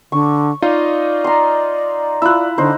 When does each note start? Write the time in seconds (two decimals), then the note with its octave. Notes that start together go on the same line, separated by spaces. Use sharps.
0.12 D3 C#6
0.62 D#4 F4 D5 D#5 F5
1.24 A#5 C6
2.22 E4 F4 E6 F#6
2.58 D3 D#4 C5